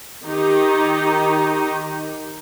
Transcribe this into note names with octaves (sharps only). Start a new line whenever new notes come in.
D#3 D#4 G4